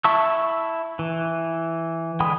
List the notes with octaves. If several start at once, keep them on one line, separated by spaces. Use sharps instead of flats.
E4 E5 A5 C#6 E6
E3
D3 G#3 G5 B5 D#6